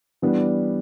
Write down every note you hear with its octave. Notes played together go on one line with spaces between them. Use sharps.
E3 G3 B3 D4